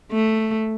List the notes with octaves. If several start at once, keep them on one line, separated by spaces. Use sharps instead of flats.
A3